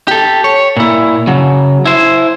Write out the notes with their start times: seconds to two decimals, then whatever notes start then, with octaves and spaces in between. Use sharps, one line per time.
0.08 G4 A4
0.44 C#5
0.77 A#2 E4
1.27 C#3 F#3
1.85 E4 C5